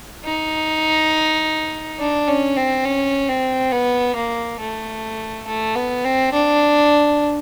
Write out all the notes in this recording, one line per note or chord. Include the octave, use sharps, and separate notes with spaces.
D#4
D4
C#4
C4
C#4
C4
B3
A#3
A3
A3
B3
C4
D4